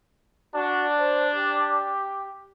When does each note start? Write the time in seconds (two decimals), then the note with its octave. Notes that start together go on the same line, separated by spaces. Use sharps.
0.55 D4 F#4
0.99 C5
1.33 G4